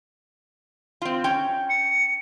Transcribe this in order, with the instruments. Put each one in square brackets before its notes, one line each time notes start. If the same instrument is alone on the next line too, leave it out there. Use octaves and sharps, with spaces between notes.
[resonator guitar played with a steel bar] C4 F4
C#4 G5
[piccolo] C#7